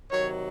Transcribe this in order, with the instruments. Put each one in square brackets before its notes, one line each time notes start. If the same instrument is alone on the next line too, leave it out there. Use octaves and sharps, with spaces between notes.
[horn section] C3 D#3 F#3 C#5